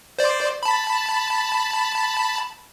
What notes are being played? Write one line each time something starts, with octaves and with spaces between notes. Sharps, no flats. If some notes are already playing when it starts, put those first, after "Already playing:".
C5 D5
A5 B5